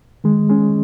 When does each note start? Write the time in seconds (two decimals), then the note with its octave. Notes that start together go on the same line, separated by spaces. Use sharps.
0.24 D#3 G#3
0.50 G#3 C#4